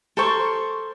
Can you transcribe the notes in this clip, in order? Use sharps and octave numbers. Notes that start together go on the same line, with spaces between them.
A4 A#4 C5 C#6